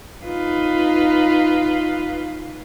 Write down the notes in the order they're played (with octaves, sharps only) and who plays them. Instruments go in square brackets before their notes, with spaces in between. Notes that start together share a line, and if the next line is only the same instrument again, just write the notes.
[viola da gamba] D#4 F4 B4